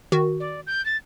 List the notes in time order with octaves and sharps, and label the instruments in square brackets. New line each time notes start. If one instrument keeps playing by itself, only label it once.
[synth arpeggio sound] D#3 F#4
[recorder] D5
G6
A6